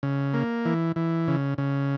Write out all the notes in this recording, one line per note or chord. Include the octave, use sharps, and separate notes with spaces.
C#3
A#3
E3
E3
C#3
C#3